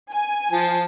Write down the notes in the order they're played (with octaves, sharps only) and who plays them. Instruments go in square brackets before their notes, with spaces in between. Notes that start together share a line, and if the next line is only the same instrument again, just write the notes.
[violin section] G#5
[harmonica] F3 A5